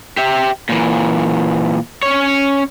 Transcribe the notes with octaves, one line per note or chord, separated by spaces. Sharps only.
G4 E5
A#2 E3
C#4 C#5